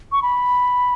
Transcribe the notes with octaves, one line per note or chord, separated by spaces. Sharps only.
C#6
B5